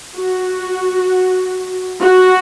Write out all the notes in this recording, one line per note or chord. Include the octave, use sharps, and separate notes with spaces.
F#4
F#4